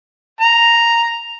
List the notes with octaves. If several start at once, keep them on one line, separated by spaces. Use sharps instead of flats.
A#5